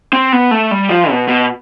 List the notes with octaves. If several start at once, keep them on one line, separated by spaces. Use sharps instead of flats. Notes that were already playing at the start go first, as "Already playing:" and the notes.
C4
B3
A3
G3
F3
B2
B2